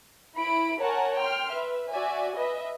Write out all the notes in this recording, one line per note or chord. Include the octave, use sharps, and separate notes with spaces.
E4 B5 D7
A#4 C#5 F#5 G#5 A5
G5 C6 F6
B4 E5
F#4 D5 E5 G#5
B4 D#5 E5